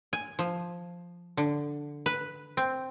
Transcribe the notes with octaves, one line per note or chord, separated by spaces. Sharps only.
G#5
F3
D3
B4
C4